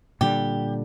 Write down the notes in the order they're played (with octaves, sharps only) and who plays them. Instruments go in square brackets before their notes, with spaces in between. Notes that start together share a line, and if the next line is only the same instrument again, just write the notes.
[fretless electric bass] A#2 D3 G3 [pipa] G4